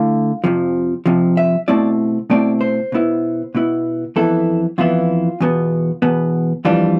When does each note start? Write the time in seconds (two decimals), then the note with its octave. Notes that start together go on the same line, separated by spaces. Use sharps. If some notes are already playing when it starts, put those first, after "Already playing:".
Already playing: D3 A3 E4 F5
0.44 F2 C3 F3
1.06 F2 C3 F3
1.37 E5
1.68 B2 A3 C4 E4 D5
2.30 B2 A3 C4 E4 D5
2.61 C5
2.92 B2 B3 E4
3.55 B2 B3 E4
4.16 F2 E3 B3 E4 A4
4.78 F2 E3 B3 E4 F4
5.41 E2 B2 B3
6.02 E2 B2 B3
6.65 F2 E3 G3 D4 F4